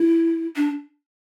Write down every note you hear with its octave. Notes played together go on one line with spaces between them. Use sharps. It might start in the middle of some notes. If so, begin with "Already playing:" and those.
Already playing: E4
D4